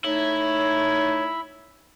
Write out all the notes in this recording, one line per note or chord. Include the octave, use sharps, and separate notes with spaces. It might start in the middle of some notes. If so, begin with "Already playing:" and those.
A3 D#4 E4 C#5